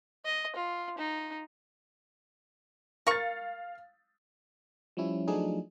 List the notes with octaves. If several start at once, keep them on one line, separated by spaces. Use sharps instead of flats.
D#5
F4
D#4
A#4 F5 C#6 A6
F3 G3 C#4 E4
F3 F#3 A3 D4 D#4 G#4